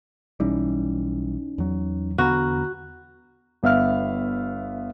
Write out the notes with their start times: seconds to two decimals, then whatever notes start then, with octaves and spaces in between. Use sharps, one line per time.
0.40 B1 E3 G3 C#4 D#4
1.58 E2 F#3
2.18 E2 D3 B3 F#4 A#5 B5 F6
3.63 G1 B3 E5 F5 F6